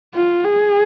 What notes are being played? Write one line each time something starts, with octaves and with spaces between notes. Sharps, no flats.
F4
G#4